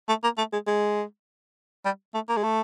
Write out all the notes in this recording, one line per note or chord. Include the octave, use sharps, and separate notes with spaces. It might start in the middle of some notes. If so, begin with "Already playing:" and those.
A3
A#3
A3
G#3
G#3
G3
A3
A#3
G#3
A3